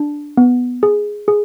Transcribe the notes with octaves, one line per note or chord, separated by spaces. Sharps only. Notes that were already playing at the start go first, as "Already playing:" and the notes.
Already playing: D4
B3
G#4
G#4